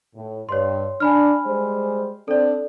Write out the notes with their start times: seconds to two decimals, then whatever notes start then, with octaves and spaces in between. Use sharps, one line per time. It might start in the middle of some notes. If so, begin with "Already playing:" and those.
0.16 A2
0.49 G2 C#5 C6
1.00 D4 G#5 B5 F6
1.46 G3 G#3 C5
2.28 C4 D4 A4 D5